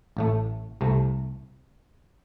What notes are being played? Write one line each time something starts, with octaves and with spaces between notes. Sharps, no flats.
A1 A2 A3
C2 C3 A3